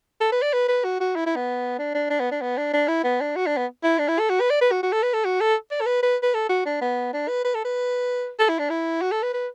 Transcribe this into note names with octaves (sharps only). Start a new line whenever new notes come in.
A4
B4
D5
B4
B4
F#4
F#4
E4
E4
B3
D4
D4
D4
B3
D4
B3
D4
D4
E4
B3
D4
F#4
D4
B3
E4
D4
E4
A4
F#4
B4
D5
B4
F#4
F#4
A4
B4
A4
F#4
A4
D5
A4
B4
B4
B4
A4
F#4
D4
B3
D4
B4
B4
A4
B4
A4
E4
D4
E4
F#4
A4
B4
B4